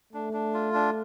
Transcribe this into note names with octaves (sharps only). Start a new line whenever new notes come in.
A3 D4
D4
F4
D4